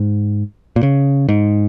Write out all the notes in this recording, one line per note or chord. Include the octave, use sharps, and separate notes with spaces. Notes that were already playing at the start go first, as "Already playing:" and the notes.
Already playing: G#2
A#2
C#3
G#2